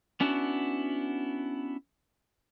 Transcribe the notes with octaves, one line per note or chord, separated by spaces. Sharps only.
B3 C#4 D4 E4 F#4